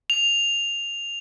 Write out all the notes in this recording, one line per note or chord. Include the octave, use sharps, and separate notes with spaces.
F7